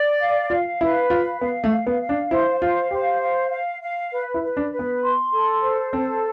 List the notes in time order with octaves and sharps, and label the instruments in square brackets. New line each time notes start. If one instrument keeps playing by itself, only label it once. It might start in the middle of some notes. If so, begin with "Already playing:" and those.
Already playing: [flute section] D5
F5
[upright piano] F4 [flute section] F5
[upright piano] E4 [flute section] B4
[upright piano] F4 [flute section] F5
[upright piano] B3 [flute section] F5
[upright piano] A3
[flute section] F5
[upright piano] B3
[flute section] F5
[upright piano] D4
[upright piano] E4 [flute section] C5
[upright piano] F4 [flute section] F5
[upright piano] G4 [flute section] C5
[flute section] F5
F5
F5
B4
[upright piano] E4
[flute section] B4
[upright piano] D4
[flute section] B4
[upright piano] B3
[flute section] C6
A4
C5
[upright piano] C4 [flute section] A4